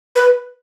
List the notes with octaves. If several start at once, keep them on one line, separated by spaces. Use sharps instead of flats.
B4